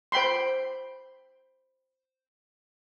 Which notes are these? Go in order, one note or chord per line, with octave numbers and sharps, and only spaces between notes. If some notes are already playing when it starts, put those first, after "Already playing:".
C5 G5 B5 C6